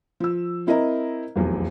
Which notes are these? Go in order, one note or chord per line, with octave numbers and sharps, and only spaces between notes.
F3 E6
C4 E4 A#4 D#5 A#5
F1 B1 E2